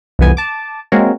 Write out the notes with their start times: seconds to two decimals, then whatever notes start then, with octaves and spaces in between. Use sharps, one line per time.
0.19 C2 F2 E3 B3 G#5
0.37 A5 D6
0.92 G#3 A#3 C4 F#4 A#4 C#5